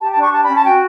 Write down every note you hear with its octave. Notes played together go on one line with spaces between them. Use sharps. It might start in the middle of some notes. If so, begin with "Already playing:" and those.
G4 A5
A5
D4
C#6
G4 A5
B5
C#4
A5
F#4 G5